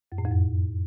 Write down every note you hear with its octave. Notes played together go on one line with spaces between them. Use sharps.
F#2
A2
F2
F#2